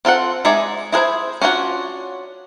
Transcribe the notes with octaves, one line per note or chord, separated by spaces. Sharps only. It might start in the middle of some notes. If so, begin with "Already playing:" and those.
C4 F4 A4 F#5
G#3 D#4 G#4 D5 E5
E4 G#4 A#4 C5 E5
C#4 D4 F4 F#4